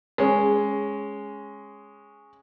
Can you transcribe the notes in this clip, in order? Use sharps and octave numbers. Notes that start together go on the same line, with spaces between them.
G#3 C#4